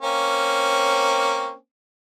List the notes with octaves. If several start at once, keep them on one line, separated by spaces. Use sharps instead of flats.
A#3 C4 C#4